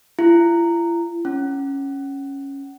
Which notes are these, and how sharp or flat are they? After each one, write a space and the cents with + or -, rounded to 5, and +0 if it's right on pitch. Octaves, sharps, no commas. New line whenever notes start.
E4 +45
C#4 -5